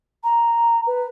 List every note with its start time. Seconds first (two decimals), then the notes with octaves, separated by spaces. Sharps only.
0.24 A#5
0.87 B4